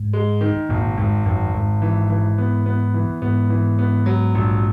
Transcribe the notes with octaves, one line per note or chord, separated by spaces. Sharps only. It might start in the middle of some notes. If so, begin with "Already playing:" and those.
Already playing: G#2
G#3
D#3
G#1 A#2
G#1 G#2
G#1 F#2
G#1 G#2
E3
E3
B3
B3
E3
G#2 B3
E3
B3
F#3
A#1